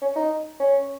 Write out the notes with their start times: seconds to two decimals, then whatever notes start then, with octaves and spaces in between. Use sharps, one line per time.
0.01 C#4
0.16 D#4
0.60 C#4